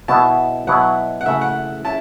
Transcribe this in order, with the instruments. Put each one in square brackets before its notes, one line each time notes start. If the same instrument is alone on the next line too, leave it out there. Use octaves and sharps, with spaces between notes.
[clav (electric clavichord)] B2 B3 E4 [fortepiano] A5
[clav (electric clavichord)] B2 F#3 B3 E4 [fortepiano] F#5
[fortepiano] F#5
[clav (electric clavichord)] C#3 A3 E4 [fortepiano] E5
[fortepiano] F#5
[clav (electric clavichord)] C#4 E4 [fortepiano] A5